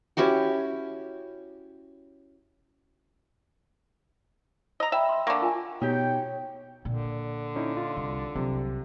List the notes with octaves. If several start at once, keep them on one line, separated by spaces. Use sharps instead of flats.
C#4 E4 F#4 G4
D#5 A#5 E6
D5 E5 G5 B5
C6 E6
D3 A#3 D5 C#6 D6
F4 A#4 G#5
B2 D#4 G4 C#5 G5
A#2 D3
C#4 D#4 E4
F4
C2
C2 C3 F#3